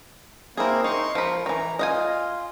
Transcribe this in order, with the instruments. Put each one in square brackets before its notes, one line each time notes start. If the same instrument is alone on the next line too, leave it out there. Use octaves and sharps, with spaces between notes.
[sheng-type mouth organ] A#3 C4 A#4 [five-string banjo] E4 G#4
[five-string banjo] D#4 [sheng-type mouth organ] C6 C#6
[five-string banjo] F3 B5 [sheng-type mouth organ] A#4
[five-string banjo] D#3 E3 [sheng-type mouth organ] A#5
[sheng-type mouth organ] F4 [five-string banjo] D#5 F5 G#5